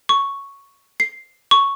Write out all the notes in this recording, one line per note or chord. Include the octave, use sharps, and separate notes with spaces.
C#6
C7
C#6